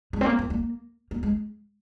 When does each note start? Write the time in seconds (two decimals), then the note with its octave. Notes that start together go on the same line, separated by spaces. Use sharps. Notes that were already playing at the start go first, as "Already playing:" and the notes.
0.13 G#3
0.21 C4
0.26 A#3
0.39 C4
0.50 A#3
1.11 A#3
1.23 G#3